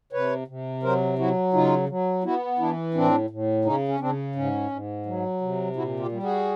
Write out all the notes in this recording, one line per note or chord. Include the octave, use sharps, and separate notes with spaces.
C3 B4 C#5
C3
F#3 A#4 C5
F#3 E4 F#4
C#3 D#4 F4
F#3
B3 E4 F#4
E3 D4 E4
A2 C4 D4
A2
C#3 C#4 D#4
C#4
C#3 C4 D4
G#2 C#4
G#2
F#3
C3
A#2 E4 F#4
F4 G4
G3
F#4 G#4